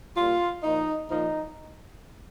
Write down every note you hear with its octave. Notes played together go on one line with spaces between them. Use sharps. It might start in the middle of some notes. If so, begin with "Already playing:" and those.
A#2 G3 F4
A#2 F3 D#4
A#2 F3 D#4